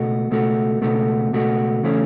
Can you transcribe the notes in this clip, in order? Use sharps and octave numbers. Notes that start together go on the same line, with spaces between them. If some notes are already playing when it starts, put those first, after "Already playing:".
Already playing: C#2 B2 A3 F#4
C#2 B2 A3 F#4
C#2 B2 A3 F#4
C#2 B2 A3 F#4
C#3 E3 A3 C#4